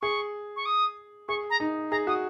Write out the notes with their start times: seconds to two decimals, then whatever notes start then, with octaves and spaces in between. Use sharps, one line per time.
0.01 G#4 C#6
0.56 C#6
0.66 D#6
1.28 G#4 C#6
1.50 A#5
1.60 D#4
1.91 G#4 A#5
2.07 F#4 D#6